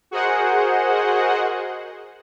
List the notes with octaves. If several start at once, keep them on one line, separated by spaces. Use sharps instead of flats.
F#4 G#4 A#4 C5 D#5 F#5